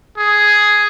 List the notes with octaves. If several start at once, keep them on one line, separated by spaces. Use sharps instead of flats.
G#4